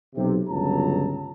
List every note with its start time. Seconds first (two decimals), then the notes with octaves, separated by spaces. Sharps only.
0.16 B1 C3
0.49 G1 C#2 F#3 A5 A#5